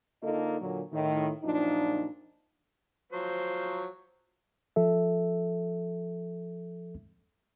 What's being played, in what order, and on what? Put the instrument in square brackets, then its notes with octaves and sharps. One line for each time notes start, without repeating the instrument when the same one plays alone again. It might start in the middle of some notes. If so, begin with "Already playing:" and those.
[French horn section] D3 A#3 D#4 F4 A4 D#5
A#2 D3 F#3
A2 D#3
F#2 A#2 F3 D4 D#4
[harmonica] F3 F#3 C5
[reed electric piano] F3 A4 E5